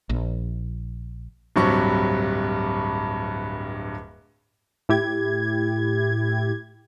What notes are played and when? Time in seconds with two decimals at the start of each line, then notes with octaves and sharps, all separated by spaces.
0.10 A#1
1.56 D1 G2 C3 F#3 G3 C#6
4.89 A2 E4 G4 G#6